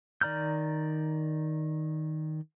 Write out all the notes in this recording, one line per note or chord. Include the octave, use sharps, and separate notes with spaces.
D#3 D5 A#5 F6 G6